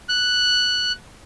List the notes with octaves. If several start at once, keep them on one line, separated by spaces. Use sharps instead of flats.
F#6